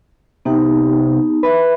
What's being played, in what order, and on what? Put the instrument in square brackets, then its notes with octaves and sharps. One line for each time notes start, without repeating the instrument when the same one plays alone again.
[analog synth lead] C3 [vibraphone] B3 D#4 G4
[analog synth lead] B4 [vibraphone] E5 B5